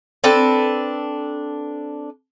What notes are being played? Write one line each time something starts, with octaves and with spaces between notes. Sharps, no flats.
C4 D4 A4 B4